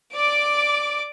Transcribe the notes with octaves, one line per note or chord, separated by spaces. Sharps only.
D5 D6